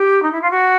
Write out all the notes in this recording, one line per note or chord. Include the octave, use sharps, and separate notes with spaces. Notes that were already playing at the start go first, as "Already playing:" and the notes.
Already playing: G4
D#4
E4
F4
F#4